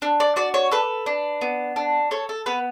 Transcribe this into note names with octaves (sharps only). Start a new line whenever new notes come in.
D4
D5
F#4 D5
C#5
A4 B4
D4
B3
D4
A4 C#5
A4
B3 B4